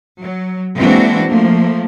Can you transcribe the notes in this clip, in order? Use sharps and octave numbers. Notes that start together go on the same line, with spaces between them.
F#3
E3 G#3 A#3 C4 D4 F#4
F3 A3 A#3